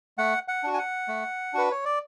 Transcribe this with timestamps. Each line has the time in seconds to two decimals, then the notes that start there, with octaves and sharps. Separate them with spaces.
0.18 A3 F#5
0.48 F#5
0.63 D4 F#4
0.74 G#5
0.78 F#5
1.08 A3
1.53 D4 F#4 B4
1.71 C#5
1.85 D5